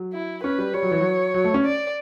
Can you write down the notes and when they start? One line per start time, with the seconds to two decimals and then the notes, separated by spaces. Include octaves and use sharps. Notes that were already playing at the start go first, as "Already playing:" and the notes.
Already playing: F#3
0.13 E4
0.44 C#4 B4
0.58 G3
0.74 G3 C#5
0.83 F#3
0.91 E3
1.00 F#3
1.34 F#3
1.44 A3
1.54 C#4
1.64 D5